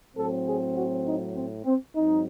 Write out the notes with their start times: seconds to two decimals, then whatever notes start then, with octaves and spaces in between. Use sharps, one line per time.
0.16 A2 F#3 C4 A4
0.46 G#4
0.76 F#4
1.06 D#4
1.35 C4
1.65 C4
1.95 G#2 F#3 C4 D#4